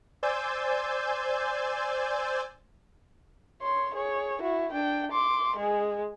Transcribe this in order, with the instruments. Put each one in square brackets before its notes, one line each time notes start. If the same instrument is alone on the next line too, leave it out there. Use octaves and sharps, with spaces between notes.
[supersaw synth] C5 D5 G#5 E6 G6 A6
[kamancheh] C#5 C6
G#4 C#5
E4 F#4
D4 G5
C6 D6
G#3 G#4